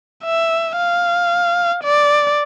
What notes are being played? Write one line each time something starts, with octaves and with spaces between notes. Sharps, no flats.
E5
F5
D5